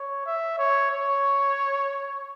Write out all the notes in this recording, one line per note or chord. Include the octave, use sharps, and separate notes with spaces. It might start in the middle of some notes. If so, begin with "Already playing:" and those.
Already playing: C#5
E5
C#5
C#5